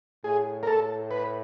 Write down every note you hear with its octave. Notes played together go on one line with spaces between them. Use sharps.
A2 G#4
A#4
A2 A4
B4